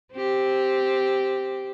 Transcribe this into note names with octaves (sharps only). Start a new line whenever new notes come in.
C4 G4